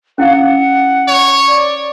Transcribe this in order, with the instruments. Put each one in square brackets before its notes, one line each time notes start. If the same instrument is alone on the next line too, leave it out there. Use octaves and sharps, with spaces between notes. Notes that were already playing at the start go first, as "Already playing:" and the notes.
[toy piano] C#4 E4 F5 [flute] F#5
[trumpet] C#5
[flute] D5